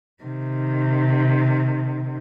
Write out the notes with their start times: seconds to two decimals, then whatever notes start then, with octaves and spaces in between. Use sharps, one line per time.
0.23 C3 D#3